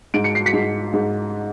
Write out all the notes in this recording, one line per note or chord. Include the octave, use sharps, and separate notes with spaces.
G#2 D7
C#7
C7
B6 C#7
G#2
G#2